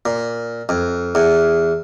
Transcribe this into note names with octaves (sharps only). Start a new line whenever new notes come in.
A#2
F2
E2